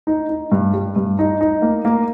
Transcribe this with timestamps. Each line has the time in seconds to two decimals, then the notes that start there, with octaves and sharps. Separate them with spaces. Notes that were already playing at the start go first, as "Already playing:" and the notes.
0.07 D#4
0.29 D#4
0.52 G2
0.73 G3
0.96 G2
1.19 D#4
1.41 D#4
1.62 A#3
1.85 A#3